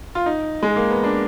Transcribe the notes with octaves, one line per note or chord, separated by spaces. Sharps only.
F4
D#4
G#3
A#3
B3
D4